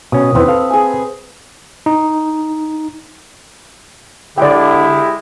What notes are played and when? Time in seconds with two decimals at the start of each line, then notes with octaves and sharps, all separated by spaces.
0.12 B2 C#4 D#6
0.35 E2 E3 C4 B4
0.48 A4 F5
0.70 G#4 G#5
1.86 D#4
4.38 D3 G#3 E4 G4 D5 G5